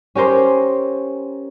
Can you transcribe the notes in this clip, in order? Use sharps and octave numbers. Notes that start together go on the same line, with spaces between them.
C#4 G4 A#4 C5